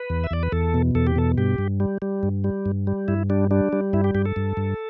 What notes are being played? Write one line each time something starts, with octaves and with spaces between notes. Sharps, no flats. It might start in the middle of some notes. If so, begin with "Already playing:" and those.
Already playing: B4
E2
E5
E2 D5
B4
E2 A4
B2
E2 A4
G4
B2 A4
G2 G4
G2
G3
G3
G2
G3
G2
G3
G2 E4
G3 D4
G3 D4
G3
G2 E4
G4
G2 G4
A4
G2
G2